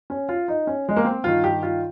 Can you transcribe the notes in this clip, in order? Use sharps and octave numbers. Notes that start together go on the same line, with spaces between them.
C#4
F4
D#4
C#4
G#3
A#3
C4
G2 D#3 F4
G4
F4